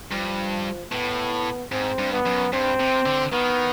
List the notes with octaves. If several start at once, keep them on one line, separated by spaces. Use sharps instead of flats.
G2 F3
A2 B3
G#2 C4
G2
B3
F#2
G2 C4
C3
D3
D#3 B3